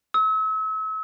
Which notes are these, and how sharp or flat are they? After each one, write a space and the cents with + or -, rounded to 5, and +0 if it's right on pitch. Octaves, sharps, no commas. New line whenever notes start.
E6 -40